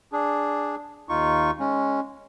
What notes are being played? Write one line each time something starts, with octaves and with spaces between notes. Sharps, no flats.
D4 G#4
D#2 D#4 F4 C#6
G#3 C#4